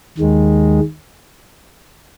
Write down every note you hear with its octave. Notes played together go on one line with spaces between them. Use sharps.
D#2 D#3 G#3